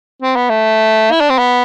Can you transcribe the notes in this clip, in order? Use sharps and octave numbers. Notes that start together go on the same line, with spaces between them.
C4
B3
A3
E4
D4
C4
B3